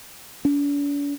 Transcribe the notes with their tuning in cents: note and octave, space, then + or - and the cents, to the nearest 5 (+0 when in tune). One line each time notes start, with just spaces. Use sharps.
D4 -45